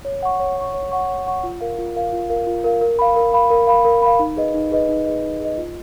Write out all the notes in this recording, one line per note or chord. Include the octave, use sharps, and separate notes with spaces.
C#5
F#5 C#6
C#5
F#5 C#6
C#5
F#5 C#6
C#5
F#5 C#6
F4
A#4 F5
F4
A#4 F5
F4
A#4 F5
F4
A#4 F5
A#4
F5 B5
A#4
F5 B5
A#4
F5 B5
A#4
F5 B5
D#4
G#4 B4 D#5
D#4
G#4 B4 D#5
D#4
G#4 B4 D#5
D#4
G#4 B4 D#5
F4